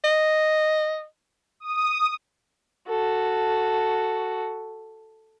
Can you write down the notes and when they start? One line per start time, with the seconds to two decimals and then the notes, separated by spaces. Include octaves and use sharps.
0.04 D#5
1.60 D#6
2.88 F#4 A4